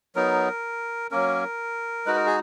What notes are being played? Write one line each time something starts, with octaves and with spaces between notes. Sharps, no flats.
F#3 B3 D#4 A#4
F#3 A#3 C#4 A#4
G#3 D#4 F#4 B4
A#4
G#4